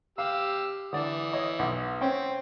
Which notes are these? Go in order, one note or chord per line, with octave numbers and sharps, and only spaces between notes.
G4 F5 E6
D3 E3 D5 D#6
C#5 D#5
B1 D6
C4 C#4 G5